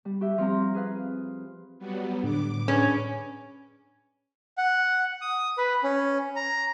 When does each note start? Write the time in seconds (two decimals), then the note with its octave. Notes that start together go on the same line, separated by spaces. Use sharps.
0.05 G3
0.20 F#4 G4 E5
0.38 F3 G3 C4 G4 A#5
0.74 G#4 B4 F5
1.79 F#3 G3 B3
2.23 A2 D3 D6
2.68 C#4 D4 G#4 B4
4.58 F#5
5.21 D#6
5.58 B4
5.84 C#4
6.36 A#5